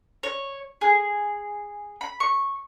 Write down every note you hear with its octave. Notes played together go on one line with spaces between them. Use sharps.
C#5
G#4
B5
C#6